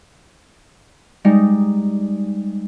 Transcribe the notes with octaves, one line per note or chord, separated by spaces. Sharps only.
G3 G#3 D#4